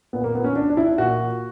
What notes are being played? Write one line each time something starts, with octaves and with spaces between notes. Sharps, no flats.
A#2 B3
A#3
B3
C#4
D4
D4
E4
A#2 F#4